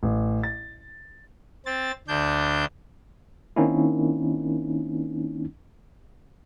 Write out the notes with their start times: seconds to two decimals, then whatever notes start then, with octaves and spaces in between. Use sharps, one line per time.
0.03 A1
0.43 A6
1.66 C4 A6
2.08 D2 D4 G6
3.56 D#3 A#3 C4 C#4 D#4 E4